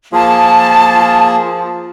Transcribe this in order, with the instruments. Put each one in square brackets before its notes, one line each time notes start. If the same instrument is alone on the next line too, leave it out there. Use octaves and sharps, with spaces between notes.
[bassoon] F3 [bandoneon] A#3 G#4 [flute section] A5